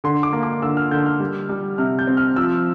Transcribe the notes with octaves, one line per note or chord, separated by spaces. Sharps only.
D3 C6
D6
A#3
D6
D3 E6
F6
D3 G6
F6
G3
G3
C3 F6
G6
C4
F6
F3 E6